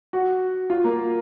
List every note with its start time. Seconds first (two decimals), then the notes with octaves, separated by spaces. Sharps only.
0.13 F#4
0.70 F4
0.84 A#3